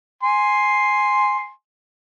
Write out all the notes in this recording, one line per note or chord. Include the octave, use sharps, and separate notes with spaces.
G#5 C6